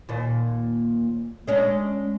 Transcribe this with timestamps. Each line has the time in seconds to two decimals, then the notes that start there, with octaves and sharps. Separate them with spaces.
0.09 D#2 A#2
1.47 G#3 C#4 D4